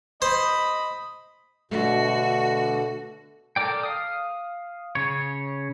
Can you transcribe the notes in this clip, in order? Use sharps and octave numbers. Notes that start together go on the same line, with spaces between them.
C5 D#5 B5
B2 D3 A3 F#4
A4 A#4 D5 G5
F5 D#6
C#3 C#5